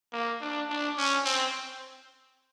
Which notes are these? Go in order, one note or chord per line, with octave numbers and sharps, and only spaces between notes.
A#3
D4
D4
C#4
C4